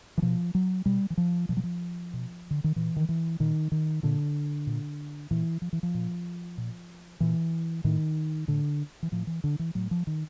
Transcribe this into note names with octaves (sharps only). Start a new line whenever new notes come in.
E3
B2 F3
F#3
B2 G3
E3
F3
B2 F3
F#3
F3
B2
D3
D#3
A#2 E3
D#3
E3
A#2 D#3
D#3
A#2 D3
A#2
A#2 E3
F3
E3
F3
A#2
A#2
A#2 E3
A2 D#3
A2 D3
E3
A2 F3
E3
D3
E3
A2 F#3
F3
D#3